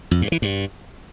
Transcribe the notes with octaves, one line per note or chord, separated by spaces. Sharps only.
F2
G2
E3
G2